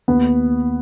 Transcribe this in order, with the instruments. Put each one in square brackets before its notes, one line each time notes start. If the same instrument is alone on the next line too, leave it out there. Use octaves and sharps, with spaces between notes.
[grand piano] D#2 B3